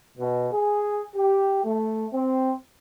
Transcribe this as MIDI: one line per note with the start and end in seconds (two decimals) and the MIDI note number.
0.17 0.47 47
0.52 1.02 68
1.15 1.62 67
1.64 2.05 57
2.12 2.52 60